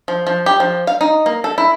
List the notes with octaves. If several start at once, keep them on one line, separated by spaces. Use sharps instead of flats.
F3
F3
G4
F3
F5
D#4
A#3
A4
E4